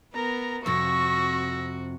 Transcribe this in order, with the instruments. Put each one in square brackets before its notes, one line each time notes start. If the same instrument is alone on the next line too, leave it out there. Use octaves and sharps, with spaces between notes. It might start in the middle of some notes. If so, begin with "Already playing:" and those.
[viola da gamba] B3 [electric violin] A#4 A#5
[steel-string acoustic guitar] F2 C3 [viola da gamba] F#4 [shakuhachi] C#6 [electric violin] E6 A#6